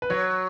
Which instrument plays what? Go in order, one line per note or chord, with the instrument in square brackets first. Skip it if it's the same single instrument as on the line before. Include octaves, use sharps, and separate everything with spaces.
[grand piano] B4
[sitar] F#3 [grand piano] C#5